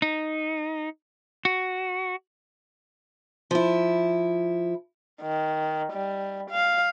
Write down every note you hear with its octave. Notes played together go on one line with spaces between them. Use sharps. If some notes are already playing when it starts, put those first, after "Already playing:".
D#4
F#4
F3 E4
D#3
G3
F5